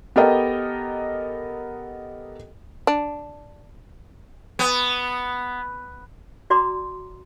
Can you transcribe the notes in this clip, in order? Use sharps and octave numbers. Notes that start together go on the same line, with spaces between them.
B3 G4 A4 A#4 D#5
D4
B3
F#4 D5 A#5 C6 D6